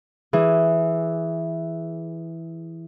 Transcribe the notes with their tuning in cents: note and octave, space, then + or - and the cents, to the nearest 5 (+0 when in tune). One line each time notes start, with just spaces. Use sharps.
E3 +0 G#4 +0